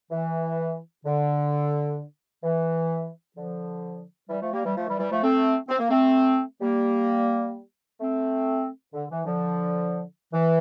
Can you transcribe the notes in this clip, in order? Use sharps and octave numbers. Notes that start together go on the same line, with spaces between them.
E3
D3
E3
D3 F3
E3 G3
F3 A3
G3 A#3
E3 G3
F3 A3
E3 G3
E3 G3
F3 A3
A3 C4
C4
A#3
A3 C4
G3 A#3
A3 C4
D3
E3
D3 F3
E3